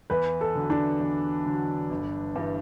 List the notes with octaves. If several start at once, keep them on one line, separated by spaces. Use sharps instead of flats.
E2 B4
A4
D3 F#3
D4
E2
D3 F#3
G1
G2 E3